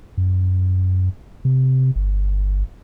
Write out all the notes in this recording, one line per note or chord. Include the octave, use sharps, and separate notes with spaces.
F#2
C3
G1